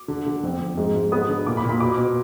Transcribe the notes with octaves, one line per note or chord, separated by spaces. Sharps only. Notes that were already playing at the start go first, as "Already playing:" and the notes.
Already playing: D6
D3
D3
F2
F2
G#2
G#2
B3 D#6
D3
A#2 D6
B5
A#2
B5
B2 D6
B2